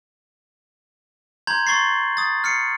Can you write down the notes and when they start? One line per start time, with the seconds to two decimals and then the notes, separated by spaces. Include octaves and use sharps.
1.47 A#5 C6 G6 G#6 F#7
1.67 C6 C#6 A6 C7
2.17 D#6 A6
2.44 F6 C7 C#7